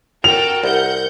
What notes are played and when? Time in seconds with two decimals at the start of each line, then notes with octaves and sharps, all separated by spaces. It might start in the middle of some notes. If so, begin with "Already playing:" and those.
0.24 F#4 A4 A#4 G5 F7
0.64 C2 F#5 G6